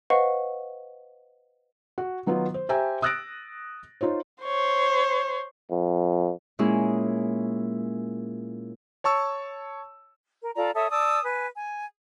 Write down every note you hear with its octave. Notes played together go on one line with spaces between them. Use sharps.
B4 C5 D#5 F5 F#5 C#6
F#4
D#3 F#3 B3 D#4 F4
C5
G4 C5 E5 G5 G#5 A#5
D#6 E6 F#6 A6 A#6 D7
D#4 F4 C5 C#5
C5 C#5
F2
A#2 G#3 C#4 E4 G#4
C#5 A5 C#6 E6
A#4
F4 A4 D5 A#5
A4 C#5 E5 D#6
D5 A5 D#6 E6
B4 G#5
G#5